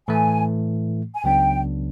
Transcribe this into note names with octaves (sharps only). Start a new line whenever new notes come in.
A2 E3 A3 G#5
G#5
C#2 C#3 F#3 B3 D4 G5